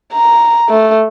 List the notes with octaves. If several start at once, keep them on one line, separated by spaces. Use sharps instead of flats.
A#5
A3